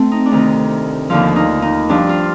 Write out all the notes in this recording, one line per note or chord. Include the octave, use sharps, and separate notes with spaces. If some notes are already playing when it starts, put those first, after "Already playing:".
Already playing: A3 C4
D#4
D4
D2 C3 D#3
D#4
D#2 D3 F3 F4
D#4
D#4
G2 F3 D4
F4